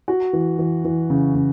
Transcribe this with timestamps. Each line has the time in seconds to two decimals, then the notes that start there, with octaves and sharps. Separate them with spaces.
0.08 F#4
0.33 E3
0.59 E3
0.85 E3
1.10 C#3
1.35 C#3